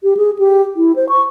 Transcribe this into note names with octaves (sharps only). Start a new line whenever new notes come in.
G4
G#4
G4
E4
C5
C#6